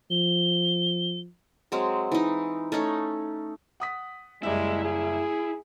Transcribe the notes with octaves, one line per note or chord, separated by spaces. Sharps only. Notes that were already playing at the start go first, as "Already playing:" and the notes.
F3 G7
F#3 G#3 C4
E3 D#4
A3 C#4 D#4 C#5
F#5 D#6 B6
F#1 G3 G#3 E4 E5
G#4